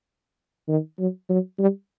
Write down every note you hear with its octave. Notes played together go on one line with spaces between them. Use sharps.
D#3
F#3
F#3
G3